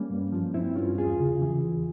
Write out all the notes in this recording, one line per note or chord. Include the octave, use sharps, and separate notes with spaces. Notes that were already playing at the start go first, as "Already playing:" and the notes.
Already playing: G3 A#3 C#4
G2
F3
G2 C4 E4
G2 C#4 F4
E2 F4 G#4
C#3
E3
E2